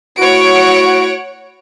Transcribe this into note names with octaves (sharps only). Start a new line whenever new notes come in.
A3 E4 F#4 C#5 F#5 D7